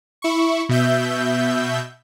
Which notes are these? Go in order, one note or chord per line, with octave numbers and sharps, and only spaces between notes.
E4 C#6
B2 E5 G6